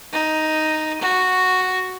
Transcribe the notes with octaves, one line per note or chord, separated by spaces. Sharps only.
D#4
F#4